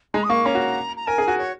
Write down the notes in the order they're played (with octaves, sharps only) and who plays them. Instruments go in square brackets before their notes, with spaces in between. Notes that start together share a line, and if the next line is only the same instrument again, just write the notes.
[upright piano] G#3 [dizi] A#5
[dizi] D#6
[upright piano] A#3 [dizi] C#6
[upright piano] C#4 [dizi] A#5
[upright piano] F#4
[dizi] A#5
[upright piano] A#4 [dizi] G#5
[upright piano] G#4
F#4
[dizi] C#5